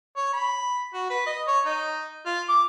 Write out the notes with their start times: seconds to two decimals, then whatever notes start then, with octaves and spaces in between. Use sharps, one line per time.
0.17 C#5
0.33 B5
0.94 F#4
1.10 B4
1.26 D#5
1.48 C#5
1.66 D#4
2.26 F4
2.49 D6